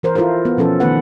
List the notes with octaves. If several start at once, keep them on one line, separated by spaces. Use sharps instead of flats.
E3 A#4 C5
E4 F4 A4 A#4 C5
B3
B2 F3 C#4 A4
D#3 A3 B3 B4 F#5